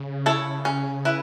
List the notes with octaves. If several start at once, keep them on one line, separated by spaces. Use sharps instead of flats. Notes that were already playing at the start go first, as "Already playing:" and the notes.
Already playing: C#3
E4 A4 C#5
C#4
E4 B4